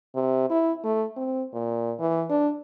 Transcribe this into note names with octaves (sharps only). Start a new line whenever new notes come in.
C3
E4
A3
C4
A#2
E3
D4